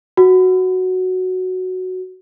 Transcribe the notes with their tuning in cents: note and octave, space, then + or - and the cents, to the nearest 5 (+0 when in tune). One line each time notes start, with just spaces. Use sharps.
F#4 +0